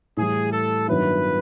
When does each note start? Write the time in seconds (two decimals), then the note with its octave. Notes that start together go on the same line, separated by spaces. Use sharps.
0.17 A2 E3 G3 G#4
0.53 A4
0.88 G2 D#3 F#3 B3 E4 B4